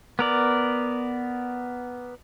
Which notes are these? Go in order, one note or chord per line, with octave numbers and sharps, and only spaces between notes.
B3 A#4 D5